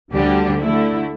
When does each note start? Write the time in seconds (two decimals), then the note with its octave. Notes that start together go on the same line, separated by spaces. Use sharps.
0.12 D2 D3 G3 D4 G4
0.60 D3 A3 E4